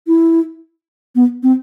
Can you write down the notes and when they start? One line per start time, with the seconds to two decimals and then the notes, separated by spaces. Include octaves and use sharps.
0.08 E4
1.16 B3
1.43 C4